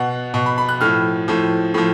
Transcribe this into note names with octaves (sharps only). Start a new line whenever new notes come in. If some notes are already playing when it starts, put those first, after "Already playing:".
Already playing: B2 F#5
B2
B5
B5
F#6
A2 F3 F6
A2 F3
A2 F3